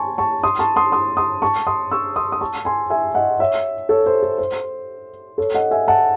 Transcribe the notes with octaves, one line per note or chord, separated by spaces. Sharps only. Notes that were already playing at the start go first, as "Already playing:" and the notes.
Already playing: G#5 A5 C6 C#6
A5 C#6
C6 D#6
A5 C#6
C6 D#6
C6 D#6
C6 D#6
A5 C#6
C6 D#6
C#6 E6
C6 D#6
D#6
A5 C#6
G#5 C6
E5 G#5
D#5 F#5
C#5 E5
A4 C#5
C5
A4
C5
A4 C#5
D#5 F#5
E5 G#5
F#5 A5